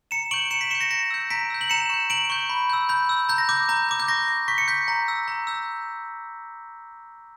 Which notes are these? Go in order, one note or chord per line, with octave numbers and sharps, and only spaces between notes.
A#5 C#7 E7
C#6 G6 D7 F#7
A#5 C#7 E7
B6 D7
C#6 G6 C#7 E7
A#6 C#7
A#5 A#6 C#7
E6 G6
A#5 B6 D7
E6 G6
F#7
A#5 C#7 E7
C#6 G6
A#5 D7 F#7
C#6 G6
B5
E6 G6
B5 G6
E6 G6
A#5 G6
A#6
D6 G6
A#5 G6
D6 G6
G6
C#6 A#6
G6
C#6 B6
C#7
G6 B6
A#5
E6 G6
A#5
E6 G6